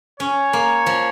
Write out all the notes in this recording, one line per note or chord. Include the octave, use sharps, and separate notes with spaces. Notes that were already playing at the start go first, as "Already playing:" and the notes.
C#4 C#5
A#3
F3